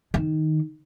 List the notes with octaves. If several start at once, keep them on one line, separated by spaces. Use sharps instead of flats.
D#3